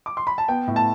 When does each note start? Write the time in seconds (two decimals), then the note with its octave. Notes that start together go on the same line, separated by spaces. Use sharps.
0.06 D6
0.17 C6
0.27 B5
0.38 A5
0.48 B3 G5
0.67 A2
0.76 A5